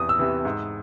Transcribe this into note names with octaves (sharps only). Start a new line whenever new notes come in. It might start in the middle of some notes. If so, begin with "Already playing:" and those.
Already playing: E2 C3 E3 D#6
E6
C3 E3
G#2